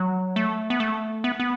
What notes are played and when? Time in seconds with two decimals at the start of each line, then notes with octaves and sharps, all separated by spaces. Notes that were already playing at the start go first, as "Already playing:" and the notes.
Already playing: F#3
0.36 A3
0.70 B3
0.80 A3
1.24 B3
1.40 B3